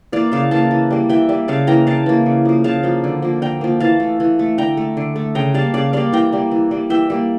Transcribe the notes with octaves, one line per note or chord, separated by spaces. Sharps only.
E3 A#3 D5 F5
C#3 F5 A5
E3 A#3 F5 A5
E3
G3 A#3
E3 E5 G5
G3 A#3
C#3 F5 A5
E3 A#3 G5 A#5
C#3 F5 A5
E3 A#3
C#3
F3 A#3
C#3 F5 A5
F3 A#3
D3
F3 A#3
D3 G5 A#5
F3 A#3
E3 F5 A5
A3
E3
A3
D3 G5 A#5
A3
D3
A3
C#3 G5 A#5
G3 A#3 F5 A5
C#3 D5 F5
G3 A#3 D5 F5
E3 G5 A#5
G3 A#3
E3
G3 A#3
E3 E5 G5
G3 A#3